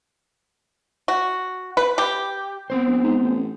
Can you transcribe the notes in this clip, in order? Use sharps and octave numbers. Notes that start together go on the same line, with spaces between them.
F#4
B4
G4
B3 C4 C5
A#1
G#2
A1